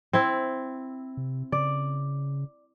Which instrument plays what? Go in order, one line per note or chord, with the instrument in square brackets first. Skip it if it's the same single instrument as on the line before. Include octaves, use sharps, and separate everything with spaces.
[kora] C4 E4
[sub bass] C3
[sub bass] C#3 [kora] D5